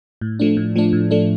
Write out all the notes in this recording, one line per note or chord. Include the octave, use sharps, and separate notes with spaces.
A2
F3 A3 D4
A2
F3 A3 D4
A2
F3 A3 D4